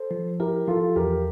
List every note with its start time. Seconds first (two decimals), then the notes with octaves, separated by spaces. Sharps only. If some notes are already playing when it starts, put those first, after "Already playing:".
Already playing: A4 C5
0.11 F3
0.40 E4 G4 A#4
0.68 F3 F4 A4
0.96 E2 G4 A#4